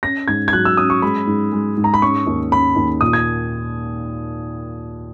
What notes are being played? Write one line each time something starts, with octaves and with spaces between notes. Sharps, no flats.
C#4 A#6
G#2 G#6
G#6
F#3 F#6
E6
C#4 D#6
C#6
G#3 B5
G#2
G#3
G#2
A#5
B5
C#4 C#6
D#2
C#4 B5
D#2
A#2 D#6
G#6